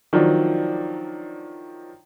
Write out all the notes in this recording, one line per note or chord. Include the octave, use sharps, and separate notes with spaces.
D#3 F3 F#3 D4